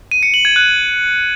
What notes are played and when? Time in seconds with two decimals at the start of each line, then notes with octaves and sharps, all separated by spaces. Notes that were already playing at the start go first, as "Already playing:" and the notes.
0.11 D#7
0.23 C#7
0.34 F#7
0.45 G#6
0.56 F#6